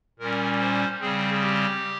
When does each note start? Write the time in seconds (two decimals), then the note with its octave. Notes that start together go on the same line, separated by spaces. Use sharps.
0.19 A#2 G3 C#4 A#4
0.60 C5
1.01 C#3 G3 C4 G#4
1.42 G4